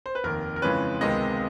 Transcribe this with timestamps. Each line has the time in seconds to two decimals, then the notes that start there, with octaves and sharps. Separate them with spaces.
0.06 C5
0.15 B4
0.24 F1 D#2 D#3 A#4
0.56 A#4
0.62 F2 C#3 E3 G#3 C#4 B4
1.01 C#2 C3 D#3 G#3 B3 D#5